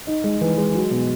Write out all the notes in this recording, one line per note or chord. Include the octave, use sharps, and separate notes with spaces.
D#4
G#3
E3
G#3
F#3
B2